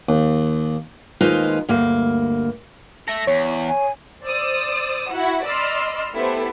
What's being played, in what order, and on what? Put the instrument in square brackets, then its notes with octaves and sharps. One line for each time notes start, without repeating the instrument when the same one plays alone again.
[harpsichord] D#2
[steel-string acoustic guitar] D#2 G#3 D#4 F4 B4 C5
D2 G2 A#3
[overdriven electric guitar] A4 E5 [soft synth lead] A#6
[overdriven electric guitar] E2 [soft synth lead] C#5
[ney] G#5
[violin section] C5 D5 D#6 E6
E4 F#4 F#5
D5 D#5 B5 C6 E6 F6
A3 B3 E4 G4 A4 C5